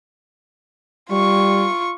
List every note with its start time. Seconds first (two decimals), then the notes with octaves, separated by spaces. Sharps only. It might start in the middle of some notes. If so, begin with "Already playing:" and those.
1.11 G3 F4 C#6